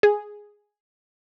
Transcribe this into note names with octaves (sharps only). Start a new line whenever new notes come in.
G#4